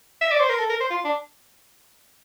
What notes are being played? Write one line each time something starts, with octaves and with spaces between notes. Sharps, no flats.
E5
D5
C5
A#4
A4
A#4
C5
F4
D4